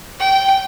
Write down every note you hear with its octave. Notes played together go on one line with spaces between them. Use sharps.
G5